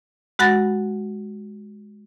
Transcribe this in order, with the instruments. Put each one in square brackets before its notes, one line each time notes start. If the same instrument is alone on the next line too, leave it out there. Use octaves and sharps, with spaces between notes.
[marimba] G#3 F#4 F#5 B5 A6 A#6